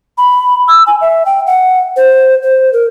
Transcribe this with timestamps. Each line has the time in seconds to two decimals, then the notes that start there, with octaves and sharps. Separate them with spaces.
0.18 B5
0.68 E6
0.87 G#5
1.01 E5
1.26 G5
1.47 F#5
1.96 C5
2.43 C5
2.73 A#4